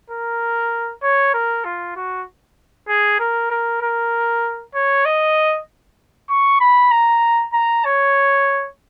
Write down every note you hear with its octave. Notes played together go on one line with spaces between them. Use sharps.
A#4
C#5
A#4
F4
F#4
G#4
A#4
A#4
A#4
C#5
D#5
C#6
B5
A#5
A#5
C#5